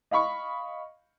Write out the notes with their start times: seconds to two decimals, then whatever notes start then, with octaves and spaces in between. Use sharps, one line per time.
0.11 D#5 F5 B5 C#6